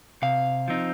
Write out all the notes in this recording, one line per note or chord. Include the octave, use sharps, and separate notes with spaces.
C3 F5
F3 C4 D#4